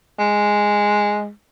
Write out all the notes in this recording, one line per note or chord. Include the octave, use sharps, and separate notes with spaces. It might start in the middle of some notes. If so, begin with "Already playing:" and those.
G#3